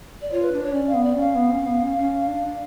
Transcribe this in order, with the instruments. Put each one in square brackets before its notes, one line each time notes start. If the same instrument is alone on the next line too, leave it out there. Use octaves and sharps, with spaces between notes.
[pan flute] D5
[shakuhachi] F4 [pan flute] C#5
[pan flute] B4
[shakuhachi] D4
[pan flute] C#5
[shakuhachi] C#4 [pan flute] D5
[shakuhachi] B3 [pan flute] F5
[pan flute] D5
[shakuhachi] C#4
[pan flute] F5
[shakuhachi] B3
C#4
B3
C#4
C#4
D4